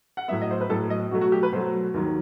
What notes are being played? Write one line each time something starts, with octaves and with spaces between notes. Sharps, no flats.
F#5
A2 F#3 B3 E5
D#5
C5
B4
A2 F#3 B3 A4
D#5
B2 F#3 A3 F#4
F#4
G4
B4
B2 F#3 A3 C5
D#2 D#3 F#3